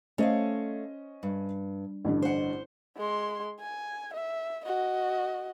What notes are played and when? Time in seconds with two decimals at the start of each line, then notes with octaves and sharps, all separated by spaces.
0.18 A3 C#4 C5 C#5 D#5 F5
1.23 G2
2.05 A1 G2 D3
2.22 C5 F#5
2.97 G#3 C6
3.60 G#5
4.14 E5
4.65 F#4 D#5